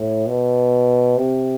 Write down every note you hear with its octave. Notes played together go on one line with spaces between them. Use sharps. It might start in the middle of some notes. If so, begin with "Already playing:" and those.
Already playing: A2
B2
C3